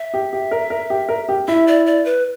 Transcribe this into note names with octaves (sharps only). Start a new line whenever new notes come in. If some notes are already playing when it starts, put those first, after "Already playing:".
Already playing: E5
G4
G4
A#4
A#4
G4
A#4
G4
E4 E5
D5
D5
B4